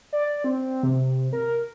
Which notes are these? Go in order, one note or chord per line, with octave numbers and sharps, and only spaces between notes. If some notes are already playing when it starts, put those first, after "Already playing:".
D5
C4
C3
A#4